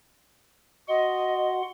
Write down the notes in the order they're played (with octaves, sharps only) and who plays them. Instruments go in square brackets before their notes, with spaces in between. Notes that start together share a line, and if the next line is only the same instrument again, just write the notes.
[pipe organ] F#4 F#5 C6 [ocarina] D#5